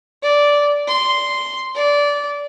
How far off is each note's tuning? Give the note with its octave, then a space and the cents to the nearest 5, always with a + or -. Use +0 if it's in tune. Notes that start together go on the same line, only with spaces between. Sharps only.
D5 -10
C6 -5
D5 -20